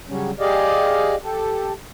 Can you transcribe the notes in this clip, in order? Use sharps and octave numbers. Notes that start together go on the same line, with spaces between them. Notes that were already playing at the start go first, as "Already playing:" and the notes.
C#3 F#3 G3 C#4
G4 G#4 D5 D#5 F5
G4 A4